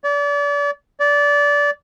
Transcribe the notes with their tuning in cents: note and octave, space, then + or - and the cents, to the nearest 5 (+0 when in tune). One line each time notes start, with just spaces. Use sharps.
D5 -35
D5 -20